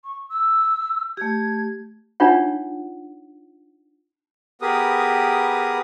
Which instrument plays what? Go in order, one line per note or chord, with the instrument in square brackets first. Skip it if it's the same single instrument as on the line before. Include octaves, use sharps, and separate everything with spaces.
[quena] C#6
E6
[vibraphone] A3 G4 [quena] G#6
[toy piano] D4 D#4 F4 C#5 F#5
[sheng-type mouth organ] B3 G4 G#4 A#4 B4 D#6